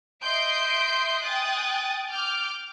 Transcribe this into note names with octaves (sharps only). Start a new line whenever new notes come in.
D#5 E5 C6 G6 C7 D7
G5 G#5 D#6 F#6 A6
D6 F6 G6